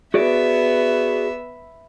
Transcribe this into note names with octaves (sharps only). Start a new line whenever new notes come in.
B3 F#4 G#4 D5 E5